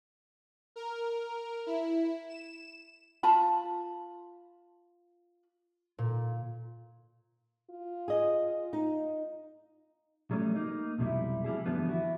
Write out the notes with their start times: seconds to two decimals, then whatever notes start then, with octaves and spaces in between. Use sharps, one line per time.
0.76 A#4
1.66 E4
2.29 E7
3.23 F4 A5 B5
5.99 A#2
7.71 F4
8.08 G#4 D#5
8.73 D#4
10.31 F#3 G3 A3 C#4
10.56 A#3 D#4
10.98 B1 F2 C3 F#3 G3 E4
11.44 F3 G3 E4 G#4
11.66 F#2 D3 E3 F3 G3 B3
11.89 E4 F#4